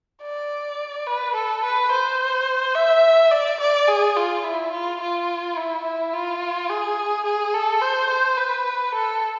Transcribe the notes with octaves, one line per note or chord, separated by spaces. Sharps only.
D5
B4
A4
B4
C5
E5
D5
D5
G#4
F4
E4
F4
F4
E4
E4
F4
G#4
G#4
A4
C5
C5
B4
A4